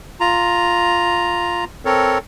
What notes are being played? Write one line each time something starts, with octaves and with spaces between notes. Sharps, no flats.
F4 A#5
C4 A4 A#4 C#5